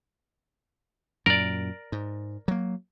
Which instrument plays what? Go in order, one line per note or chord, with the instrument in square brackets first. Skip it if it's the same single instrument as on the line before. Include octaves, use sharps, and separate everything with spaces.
[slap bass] F#2 A#2 [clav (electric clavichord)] A#4 D5
[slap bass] G#2
F#3 A#3